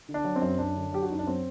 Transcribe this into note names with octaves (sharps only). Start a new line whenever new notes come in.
D3
D4
F#3
C4
F#2
F#2 D4
D3
F#3 G4
F#4
F#2 D#4
D4
F#3 C4